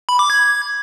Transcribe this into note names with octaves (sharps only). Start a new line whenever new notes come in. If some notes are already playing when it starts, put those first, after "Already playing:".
B5
D6
G#6